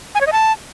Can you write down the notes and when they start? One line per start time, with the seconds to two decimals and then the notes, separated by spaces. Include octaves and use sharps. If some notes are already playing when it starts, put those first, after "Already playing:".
0.15 G#5
0.21 C#5
0.27 D#5
0.33 A5